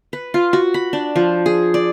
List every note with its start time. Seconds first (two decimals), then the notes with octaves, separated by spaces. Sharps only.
0.13 B4
0.34 F4
0.53 F#4
0.74 B5
0.93 D4
1.16 F3
1.46 G#4
1.74 D5